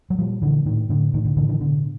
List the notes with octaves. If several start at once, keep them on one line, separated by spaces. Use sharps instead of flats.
F#3
A#2 F3 G3
A#2 D3 E3
A2 D#3
A2 D3
A2 D#3
D3
A2 D3 E3
D3 E3
B2 D3